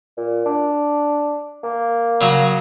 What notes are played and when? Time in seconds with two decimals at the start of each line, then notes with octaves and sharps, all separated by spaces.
0.17 A#2
0.45 D4
1.64 A#3
2.21 C#3 F#3 A#5